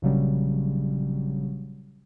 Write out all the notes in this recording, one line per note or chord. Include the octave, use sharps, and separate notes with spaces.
A#1 C#3 F#3 G3